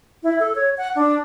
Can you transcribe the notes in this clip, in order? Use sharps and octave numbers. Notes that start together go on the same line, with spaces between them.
E4
A4
C#5
F#5
D4